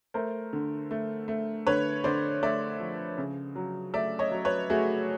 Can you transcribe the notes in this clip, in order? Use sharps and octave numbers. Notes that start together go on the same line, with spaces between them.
A3 A#4 C5
D3
A3
A3
D3 B4 C#5
D3 C5 D5
A3 D5 E5
F3
C#3
F#3
A3 D5 E5
C#5 D#5
F#3
B4 C#5
A3 F#4 G#4